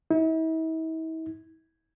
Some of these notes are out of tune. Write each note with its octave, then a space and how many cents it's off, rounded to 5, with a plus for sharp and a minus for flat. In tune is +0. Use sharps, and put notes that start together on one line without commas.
E4 -45